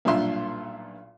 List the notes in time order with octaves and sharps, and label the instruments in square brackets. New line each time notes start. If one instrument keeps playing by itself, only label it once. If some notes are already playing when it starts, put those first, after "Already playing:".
[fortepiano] B1 G2 A#2 F4 E5 C6